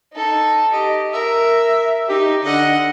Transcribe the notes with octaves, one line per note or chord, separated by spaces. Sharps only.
D#4 A4
G4 D#5
A#4 E5
D#4 G4
D3 D#5 F#5